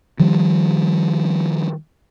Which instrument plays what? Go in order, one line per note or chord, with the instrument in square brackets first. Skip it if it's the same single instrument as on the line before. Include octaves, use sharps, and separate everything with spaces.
[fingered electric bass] D#3 F3 G3